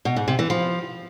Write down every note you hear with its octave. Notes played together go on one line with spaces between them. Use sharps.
B2
G#2
C3
E3
F3